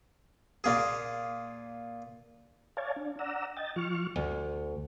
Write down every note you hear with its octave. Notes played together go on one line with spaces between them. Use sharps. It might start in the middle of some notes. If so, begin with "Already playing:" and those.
A#2 A#3 G#4
C#5 D5 F5 G#5 A5
D4
D5 F#5 A#5 E6
D#5 G5 A6
F3 C#6 F6
D2